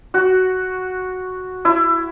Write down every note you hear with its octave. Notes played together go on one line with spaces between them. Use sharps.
F#4
E4